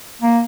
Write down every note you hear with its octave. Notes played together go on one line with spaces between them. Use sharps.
A#3